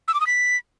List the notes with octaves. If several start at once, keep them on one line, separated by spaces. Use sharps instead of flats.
E6
D6
D#6
B6